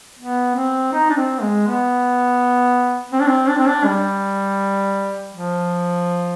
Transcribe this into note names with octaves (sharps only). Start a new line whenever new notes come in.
B3
C4
D#4
D4
C4
G#3
B3
C4
D4
C4
D4
C4
D4
G3
F3